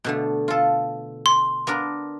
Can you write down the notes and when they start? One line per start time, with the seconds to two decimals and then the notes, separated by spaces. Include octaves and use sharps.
0.04 B2 D3 A3
0.48 F4 A4
1.26 C6
1.67 B3 D4 A#4